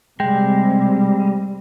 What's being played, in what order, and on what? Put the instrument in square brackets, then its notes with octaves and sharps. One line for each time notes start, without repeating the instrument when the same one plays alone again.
[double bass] C3 C4 [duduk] G3 [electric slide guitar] G#3 [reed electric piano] G5